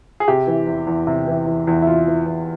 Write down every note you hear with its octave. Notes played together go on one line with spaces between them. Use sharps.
G#4
C3 G4
E3
E2
E2
C3
E3
E2
E2
E4
C3 F4
E3
E2